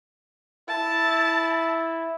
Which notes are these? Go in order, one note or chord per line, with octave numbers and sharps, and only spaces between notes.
E4 A5